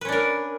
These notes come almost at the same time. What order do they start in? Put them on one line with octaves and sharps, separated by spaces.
B4 C#4 D4 A#4